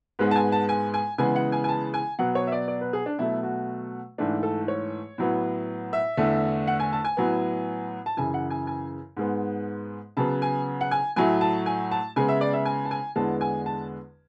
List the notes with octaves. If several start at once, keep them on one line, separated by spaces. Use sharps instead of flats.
G#2 G#3 B3 B4
A5
G#5
A5
G#5
G#5
C#3 E3 G#3 B3 G#5
F#5
G#5
G#5
A5
G#5
B2 F#3 B3 F#5
C#5
E5
D5
D5
B4
G#4
D4
B2 F#3 A3 E4
F#4
G#2 E3 A3 D4
A4
C#5
A2 F#3 B3
E5
E2 D3 A3
F#5
G#5
A5
G#5
A2 F#3 B3
A5
F#2 C#3 E3 G#5
F#5
G#5
G#5
G#2 G#3 B3
C#3 F#3 B3 A5
G#5
F#5
G#5
A2 F#3 A3 G#5
A5
G#5
A5
C#3 G#3 B3 G#5
E5
D5
E5
G#5
A5
G#5
E2 D3 G#3 B3 A5
G#5
A5